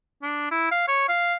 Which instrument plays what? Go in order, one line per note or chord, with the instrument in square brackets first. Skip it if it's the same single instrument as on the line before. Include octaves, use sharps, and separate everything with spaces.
[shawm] D4
E4
F5
C#5
F5